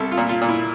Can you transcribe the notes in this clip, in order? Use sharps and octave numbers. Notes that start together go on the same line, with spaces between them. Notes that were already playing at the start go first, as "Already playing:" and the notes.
Already playing: C2 A4
F4
A#2
F4
A#2
E4